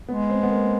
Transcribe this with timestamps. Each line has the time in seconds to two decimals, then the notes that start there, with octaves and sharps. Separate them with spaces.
0.08 G#3 B3
0.30 C4
0.43 B3
0.50 A#3